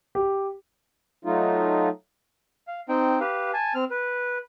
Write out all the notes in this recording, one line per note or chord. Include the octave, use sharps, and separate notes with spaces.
G4
F#3 A3 D#4 F4
F5
C4 D#4 G5
G4 B4 F5
G#5 A5
C4 F6
B4